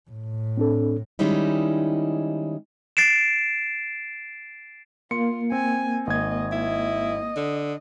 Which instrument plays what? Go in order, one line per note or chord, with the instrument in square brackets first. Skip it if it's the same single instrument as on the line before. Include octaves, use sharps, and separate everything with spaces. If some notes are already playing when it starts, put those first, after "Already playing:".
[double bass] A2
[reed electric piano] C4 D4 A4
[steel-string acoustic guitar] D#3 G3 G#3 C#4 D#4 E4
[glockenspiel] A6 C7 D7 E7
[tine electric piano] A#3 [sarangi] F4 [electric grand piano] C6 C#7
[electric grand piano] C4 [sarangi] G#5
[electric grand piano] G#1 G#6 [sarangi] D#5
[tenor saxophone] E4 [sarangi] D#5
[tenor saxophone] D3